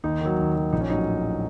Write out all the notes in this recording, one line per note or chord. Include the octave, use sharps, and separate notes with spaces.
D#2 D#4
D#3 F#3
D#2
D#3 F#3
A#1 D#4
C#4
A2 F#3 D#4